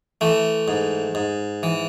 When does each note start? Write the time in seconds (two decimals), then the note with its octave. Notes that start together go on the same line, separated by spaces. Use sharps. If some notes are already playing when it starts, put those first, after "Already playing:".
0.21 E3 A3
0.68 G#2
1.15 G#2
1.63 E3